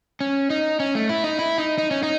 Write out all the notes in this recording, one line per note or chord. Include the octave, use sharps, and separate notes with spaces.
C#4
D#4
C#4
A3
E4
D#4
E4
D#4
D#4
C#4
D#4